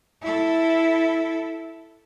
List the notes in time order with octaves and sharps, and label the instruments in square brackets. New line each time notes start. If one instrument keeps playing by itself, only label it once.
[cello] E4 A4